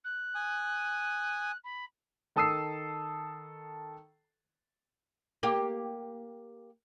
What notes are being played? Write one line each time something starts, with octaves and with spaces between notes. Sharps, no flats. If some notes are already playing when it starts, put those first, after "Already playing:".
F#6
G#5 D#6
B5
D#3 A4 A5 D#6 E6 C7
A#3 G4